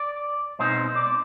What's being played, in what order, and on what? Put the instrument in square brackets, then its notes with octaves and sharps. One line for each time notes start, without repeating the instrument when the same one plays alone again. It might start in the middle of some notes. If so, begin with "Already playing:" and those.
Already playing: [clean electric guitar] D5
B2 G#3 C4 D#4 C5
D5